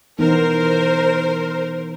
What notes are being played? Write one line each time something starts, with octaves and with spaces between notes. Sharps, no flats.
E3 B3 D#4 A#4 C5